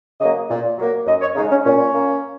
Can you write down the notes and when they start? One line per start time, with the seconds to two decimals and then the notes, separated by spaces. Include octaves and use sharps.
0.20 C#3 F#3 A#3 D#5
0.50 A#2
0.79 F#3 A#3
1.06 F#2 D#5
1.21 C#5
1.35 C#3 D#4
1.38 G#3
1.50 C#4
1.65 A#2 C#4
1.94 A#3